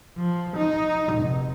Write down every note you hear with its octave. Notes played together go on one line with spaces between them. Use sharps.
F3
D#4
F1